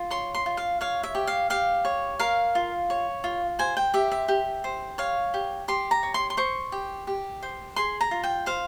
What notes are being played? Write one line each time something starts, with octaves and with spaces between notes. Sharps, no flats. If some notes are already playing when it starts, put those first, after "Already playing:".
Already playing: F4
C#5 C6
C6
F4
F5
C#5 F5
E5
G4
F5
G4 F5
C#5
A#4 F5
F4
C#5
F4
C5 G#5
G5
G4 E5
E5
G4
C5
C#5 F5
G4
G4 C6
A#5
C#5
C6
C6
C5 C#6
G4
G4
C5
G#4 C6
A#5
F4
G5
C5 F5